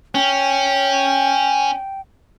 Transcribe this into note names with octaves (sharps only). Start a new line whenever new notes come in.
C#4 G5